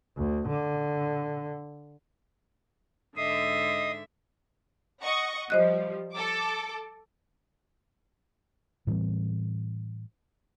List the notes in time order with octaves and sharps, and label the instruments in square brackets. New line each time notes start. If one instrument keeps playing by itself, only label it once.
[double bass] D2
D3
[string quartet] G#2 D3 E5 [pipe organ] D#5 D#6 [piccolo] C7
[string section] D#5 F#5 C#6
[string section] F3 G3 [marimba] C5 D#5 F#6
[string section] A4 D6
[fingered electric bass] A2 E3 G3 C4